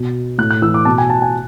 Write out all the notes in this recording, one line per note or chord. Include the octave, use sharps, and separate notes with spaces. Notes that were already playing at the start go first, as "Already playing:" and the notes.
Already playing: B2
A2 F#6
F#6
E3 E6
D6
B2 A5
G#5
A5
G#5